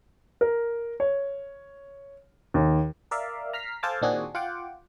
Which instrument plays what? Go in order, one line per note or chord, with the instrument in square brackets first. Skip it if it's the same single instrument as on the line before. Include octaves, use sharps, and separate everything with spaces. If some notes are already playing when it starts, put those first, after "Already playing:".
[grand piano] A#4
C#5
D#2
[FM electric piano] A#4 D5 E5 F5
A#5 F6 B6 C7
A4 C5 F5 G#5 A5 D6
A#2 D#3 C4 D4 F#4 G#4
F4 F#5 G5 D6